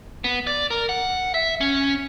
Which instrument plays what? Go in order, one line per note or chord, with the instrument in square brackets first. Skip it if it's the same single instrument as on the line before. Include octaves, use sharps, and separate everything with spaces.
[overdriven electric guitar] B3
D5
A#4
F#5
E5
C#4